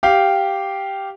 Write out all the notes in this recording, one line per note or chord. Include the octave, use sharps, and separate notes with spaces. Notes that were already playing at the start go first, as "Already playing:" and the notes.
G4 F5 G5